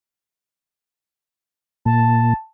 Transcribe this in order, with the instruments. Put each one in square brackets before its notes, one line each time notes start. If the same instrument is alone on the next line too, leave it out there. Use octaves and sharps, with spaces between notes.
[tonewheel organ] A#2 [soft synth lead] A5